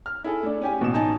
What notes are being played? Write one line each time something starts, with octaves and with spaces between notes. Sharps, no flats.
F6
E4 G#4 A4
A3 D4
C#4 G4 G#5
A1 B2 E7
D#4 G#5 A5